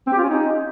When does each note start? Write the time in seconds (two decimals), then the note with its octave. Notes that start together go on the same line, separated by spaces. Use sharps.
0.07 C4
0.12 G4
0.18 F4
0.23 C#4
0.29 D#4